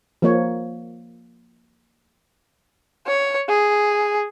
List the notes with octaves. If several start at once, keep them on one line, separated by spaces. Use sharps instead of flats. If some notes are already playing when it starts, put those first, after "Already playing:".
F3 A#3 C#5
C#5
G#4